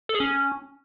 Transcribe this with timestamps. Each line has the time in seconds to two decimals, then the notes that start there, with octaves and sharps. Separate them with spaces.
0.09 A4
0.15 G#4
0.20 C#4